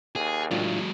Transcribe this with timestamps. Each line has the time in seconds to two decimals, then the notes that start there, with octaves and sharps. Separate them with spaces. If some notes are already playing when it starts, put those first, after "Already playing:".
0.15 D#2 G#4
0.51 A2 F#3 G#3 D4 F4